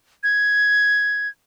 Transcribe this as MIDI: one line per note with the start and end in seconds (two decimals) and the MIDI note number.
0.23 1.28 92